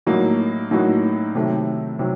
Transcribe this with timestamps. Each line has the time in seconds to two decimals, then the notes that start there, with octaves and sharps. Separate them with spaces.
0.07 A2 F#3 A#3 D#4 F#4
0.71 A2 F#3 A#3 D#4 F#4
1.35 C3 D#3 F#3 A3
1.99 C3 D#3 F#3